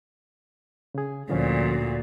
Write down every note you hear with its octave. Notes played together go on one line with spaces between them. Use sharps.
C#3 G#4
D2 A#2 D3 F3 C#4